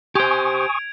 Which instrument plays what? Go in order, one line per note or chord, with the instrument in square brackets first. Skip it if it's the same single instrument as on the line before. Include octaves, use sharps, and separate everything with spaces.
[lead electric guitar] G4 C5 [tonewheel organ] G#5 C#6 D#6 [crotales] G#6 D7 F7